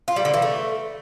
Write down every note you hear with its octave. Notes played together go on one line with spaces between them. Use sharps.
F4
G3
D3
E3
A3